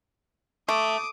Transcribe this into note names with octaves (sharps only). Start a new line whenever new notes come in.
A3 D6 D#6